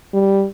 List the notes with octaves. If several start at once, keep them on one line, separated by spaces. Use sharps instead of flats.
G3